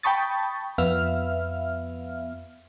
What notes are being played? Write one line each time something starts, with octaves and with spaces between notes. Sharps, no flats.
G5 A5 B5 C#6 D#6 A6
F2 B3 E5 F5 F6